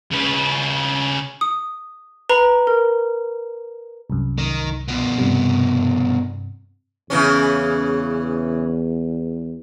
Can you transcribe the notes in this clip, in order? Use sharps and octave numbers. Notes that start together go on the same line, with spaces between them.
C#3 B4
D#6
B4 A#5 B5
A#4
C2 F#2
D#3
B2 F3
G2 C3
E2 C#3 E3 C#4